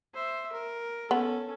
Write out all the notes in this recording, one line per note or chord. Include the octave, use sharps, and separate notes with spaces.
C5 E5
A#4
B3 C#4 A4